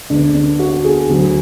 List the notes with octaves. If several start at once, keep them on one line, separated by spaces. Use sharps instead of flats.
D2 D3 G#3 B3 D4
D4
F#4
G#4
D2 D3 F#3